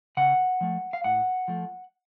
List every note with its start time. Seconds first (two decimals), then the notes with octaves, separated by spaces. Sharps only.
0.17 C#3 F#5
0.61 F3 A3
0.93 F5
1.04 A2 F#5
1.48 F3 A3